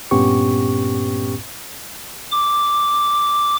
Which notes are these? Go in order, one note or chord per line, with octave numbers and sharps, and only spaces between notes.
G2 A#2 B3 C#4 G4 C#6
D6